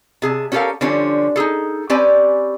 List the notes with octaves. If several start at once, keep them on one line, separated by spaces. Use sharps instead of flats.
C3 G#4 A5
C#4 F#4 G4 A4 A#4 F5
D3 F3 G3 C#4 D4
D#4 F4 G#4 A4
C4 C#4 G4 B4 D5 G#5